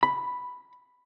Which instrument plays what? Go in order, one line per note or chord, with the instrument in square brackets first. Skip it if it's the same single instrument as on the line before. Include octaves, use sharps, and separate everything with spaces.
[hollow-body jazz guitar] B5